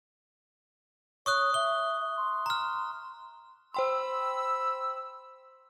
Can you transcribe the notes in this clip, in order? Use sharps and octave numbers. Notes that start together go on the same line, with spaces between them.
C#5 C#6 D#6 F#6
E5 G7
C6
A#5 F6
C5 G5 B5 C6 E6